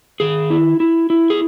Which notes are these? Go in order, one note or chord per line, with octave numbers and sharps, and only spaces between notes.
D#3 G#4
E4
E4
E4
G#4